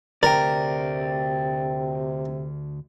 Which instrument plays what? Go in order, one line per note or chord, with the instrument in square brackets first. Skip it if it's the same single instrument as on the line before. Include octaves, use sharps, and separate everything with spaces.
[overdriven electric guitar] D2 [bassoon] C3 [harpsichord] A#4 [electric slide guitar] D5 G5